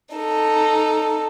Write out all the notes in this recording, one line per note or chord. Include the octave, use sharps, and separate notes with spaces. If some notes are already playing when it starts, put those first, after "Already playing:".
D#4 A4